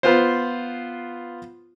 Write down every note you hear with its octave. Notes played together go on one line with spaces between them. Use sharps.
B3 F4 C5